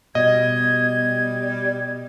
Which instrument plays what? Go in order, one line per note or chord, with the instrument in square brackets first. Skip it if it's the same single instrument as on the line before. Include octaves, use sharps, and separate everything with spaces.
[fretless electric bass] B2 [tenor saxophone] G3 [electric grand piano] D#5 [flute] G#6